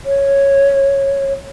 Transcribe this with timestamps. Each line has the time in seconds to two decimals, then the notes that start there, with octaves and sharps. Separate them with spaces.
0.06 C#5